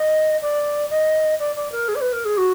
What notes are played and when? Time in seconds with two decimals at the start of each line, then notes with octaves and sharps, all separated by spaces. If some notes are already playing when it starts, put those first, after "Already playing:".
Already playing: D#5
0.41 D5
0.90 D#5
1.39 D5
1.55 D5
1.72 A#4
1.88 G#4
1.95 D5
2.01 B4
2.12 A#4
2.25 G#4
2.37 F#4